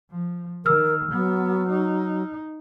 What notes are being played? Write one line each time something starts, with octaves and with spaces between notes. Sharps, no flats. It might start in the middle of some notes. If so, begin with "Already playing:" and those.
F3
D#3 A#4 E6 F6
F#3 B3
D#4